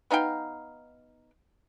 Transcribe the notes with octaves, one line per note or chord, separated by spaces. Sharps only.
B3 D#4 F5 G5